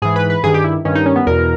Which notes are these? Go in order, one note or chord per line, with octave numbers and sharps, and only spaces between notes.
G#2 E3 G#4
B4
B4
G2 D#3 G#4
G4
E4
G2 D#3 C#4
D#4
C#4
B3
E2 B2 A#4